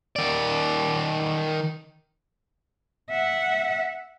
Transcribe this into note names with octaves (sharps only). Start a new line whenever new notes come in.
D#3 D5
E5 F#5